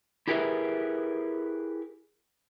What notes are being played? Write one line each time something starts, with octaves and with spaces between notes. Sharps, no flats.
E4 G4 G#4 A#4 B4 E5